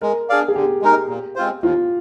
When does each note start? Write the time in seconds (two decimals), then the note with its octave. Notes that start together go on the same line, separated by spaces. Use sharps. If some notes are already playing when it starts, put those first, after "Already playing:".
0.01 G#3 A#4
0.29 D4 G#4 D5 F5
0.48 G#4
0.55 D3 G4
0.82 G#3 D#4 A#4
1.09 A#2
1.35 G#3 C4 F4 C5
1.63 D#2 F4